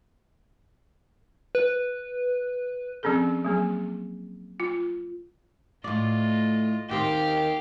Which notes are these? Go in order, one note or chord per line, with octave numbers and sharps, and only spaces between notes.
B4
F3 C4 C#4 G#4 A4
F#3 A#3 G#4
F4
A2 F4 D5 D#5
D#2 D#3 C4 G4 F5